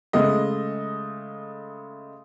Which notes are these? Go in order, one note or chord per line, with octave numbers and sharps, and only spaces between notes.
C#3 G#3 A3 D#5